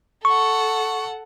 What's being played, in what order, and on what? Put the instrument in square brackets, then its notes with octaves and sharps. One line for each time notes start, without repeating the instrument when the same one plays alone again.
[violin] A4 F#5 [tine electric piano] C#6